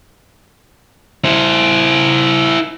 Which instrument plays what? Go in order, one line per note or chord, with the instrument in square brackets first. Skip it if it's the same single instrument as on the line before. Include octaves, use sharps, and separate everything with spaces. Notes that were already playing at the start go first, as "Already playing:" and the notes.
[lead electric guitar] E4 C5